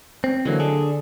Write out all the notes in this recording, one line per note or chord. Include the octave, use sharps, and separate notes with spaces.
C4
D3 E3 F#3 G#3 A#3
D4 G#4 A4